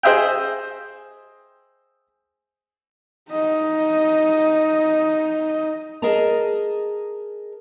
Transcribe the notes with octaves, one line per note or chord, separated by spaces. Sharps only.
G#4 C5 D#5 E5 G5
D#4 D#5
G#4 A#4 D#5 A5 A#5